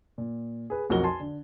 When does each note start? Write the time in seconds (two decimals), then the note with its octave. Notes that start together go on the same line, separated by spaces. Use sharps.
0.18 A#2
0.70 G#4 B4
0.90 B1 F2 F#4 A#4 G7
1.04 G#5 A5 C6
1.20 D3